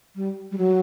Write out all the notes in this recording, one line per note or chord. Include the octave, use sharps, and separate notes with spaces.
G3
G3
F#3